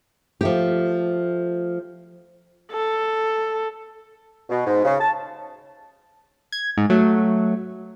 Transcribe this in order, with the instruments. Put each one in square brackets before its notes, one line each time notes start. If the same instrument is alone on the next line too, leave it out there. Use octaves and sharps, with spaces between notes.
[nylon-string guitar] F3 A3 G4
[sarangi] A4
[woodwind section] B2
G#2
C#3
A5
[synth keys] G#6
G#2
F#3 A3